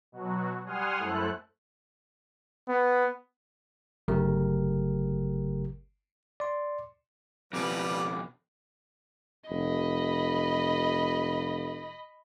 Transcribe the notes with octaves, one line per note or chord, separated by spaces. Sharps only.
B2 F#3 F#4
G3 F#5 G#5 C6 D#6 F6
F#2 A3 E4 A4 C5 F#6
B3
G1 C#3 F#3 A3 G4 A#4
D5 C6
F2 B2 F3 G3 B4 D6
F1 D#5 B5